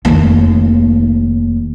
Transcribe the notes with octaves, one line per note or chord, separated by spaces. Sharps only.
F1 D#2